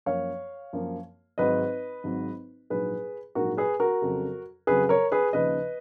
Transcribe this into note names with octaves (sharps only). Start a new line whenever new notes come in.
F#2 F3 A#3 C#5 F5
F#2 F3 A#3
G#1 G#2 F#3 B4 D#5
G#1 G#2 F#3
A#1 G#2 F#3 G#4 B4
A#1 G#2 F#3 F#4 A#4
G#4 B4
F#4 A#4
F2 C#3 F#3
F2 C#3 F#3 G#4 B4
A#4 C#5
G#4 B4
D#2 C#3 F3 B4 D#5